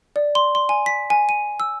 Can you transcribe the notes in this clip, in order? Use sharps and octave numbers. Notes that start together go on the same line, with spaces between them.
D5
C6
C6
G#5
B6
G#5
D#7
E6